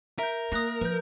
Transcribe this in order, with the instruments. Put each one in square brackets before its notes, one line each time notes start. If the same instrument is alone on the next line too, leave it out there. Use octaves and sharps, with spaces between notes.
[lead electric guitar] A#4 [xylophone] E5 G6
[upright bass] A#3 [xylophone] D#6 F#6 A#6
[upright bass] F3 [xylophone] B4 G6